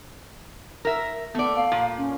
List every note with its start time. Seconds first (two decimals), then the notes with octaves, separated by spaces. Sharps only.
0.85 A#4 E5
1.35 A3 B3 D5
1.56 F5
1.72 A#2
1.98 C#4